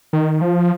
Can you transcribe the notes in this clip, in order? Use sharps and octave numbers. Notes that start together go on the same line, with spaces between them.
D#3
F3